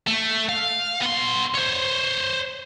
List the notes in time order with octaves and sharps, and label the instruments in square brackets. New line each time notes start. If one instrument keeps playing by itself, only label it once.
[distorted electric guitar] A3
F5
B3 C6
C5 C#5